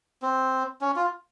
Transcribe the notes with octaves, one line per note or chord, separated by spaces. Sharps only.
C4
C#4
F4